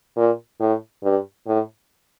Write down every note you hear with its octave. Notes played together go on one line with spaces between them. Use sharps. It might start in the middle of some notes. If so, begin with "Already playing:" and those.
A#2
A2
G2
A2